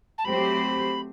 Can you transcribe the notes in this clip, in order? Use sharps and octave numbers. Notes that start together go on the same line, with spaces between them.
A5
F#3 A3 C4 G4 C5 B5